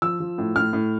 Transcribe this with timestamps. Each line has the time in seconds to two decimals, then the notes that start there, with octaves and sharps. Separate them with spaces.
0.02 F3 E6
0.20 F3
0.38 A2
0.56 A2 F6
0.73 A2